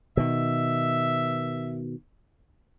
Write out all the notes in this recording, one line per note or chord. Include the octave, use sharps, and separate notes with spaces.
B2 D#3 E5